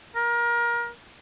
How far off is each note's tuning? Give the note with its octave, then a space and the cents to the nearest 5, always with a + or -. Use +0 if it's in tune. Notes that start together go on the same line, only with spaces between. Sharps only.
A#4 +25